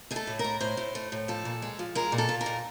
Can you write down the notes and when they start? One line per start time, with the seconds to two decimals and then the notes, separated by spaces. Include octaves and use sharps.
0.11 A3 G#4
0.16 A4
0.27 A2
0.39 A#4
0.44 A2
0.60 A2 C5
0.77 A2
0.95 A3
1.12 A2
1.28 F3 A4
1.45 A#2
1.62 G#3
1.79 F3
1.95 G#3 A#4
2.12 A#2
2.18 A4
2.29 A#2
2.41 A#4
2.46 A#2